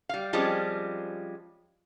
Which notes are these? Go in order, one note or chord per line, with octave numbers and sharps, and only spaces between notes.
G3 F5
F3 G3 G#3 C4 C#4 F4